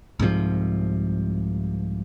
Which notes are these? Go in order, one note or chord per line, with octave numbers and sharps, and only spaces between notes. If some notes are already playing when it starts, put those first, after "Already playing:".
C2 G#2 C3 F3